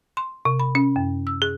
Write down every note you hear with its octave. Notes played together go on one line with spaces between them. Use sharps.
C6
C3
B5
C#4
F#2
E6
G#4